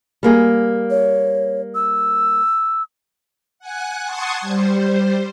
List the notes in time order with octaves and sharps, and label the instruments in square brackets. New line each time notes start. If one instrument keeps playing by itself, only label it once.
[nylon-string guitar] G3 A#3 G#4
[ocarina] C#5
E6
[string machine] F#5 G#5 F#6
F#5 A5 C6 C#6 D#6 G#6
G3 C5